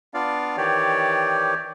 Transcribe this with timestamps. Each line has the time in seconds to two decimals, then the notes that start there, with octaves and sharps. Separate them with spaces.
0.14 B3 D4 F4 D5 F5
0.57 D#3 E3 G4 C#5 D5